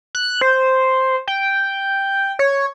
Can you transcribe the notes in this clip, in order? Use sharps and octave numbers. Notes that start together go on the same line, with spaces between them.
F#6
C5
G5
C#5